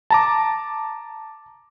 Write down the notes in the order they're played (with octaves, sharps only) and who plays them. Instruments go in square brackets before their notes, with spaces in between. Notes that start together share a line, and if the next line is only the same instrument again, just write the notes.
[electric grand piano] A5 A#5 D6